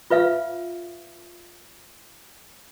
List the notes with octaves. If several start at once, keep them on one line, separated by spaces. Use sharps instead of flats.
F4 B4 E5 F5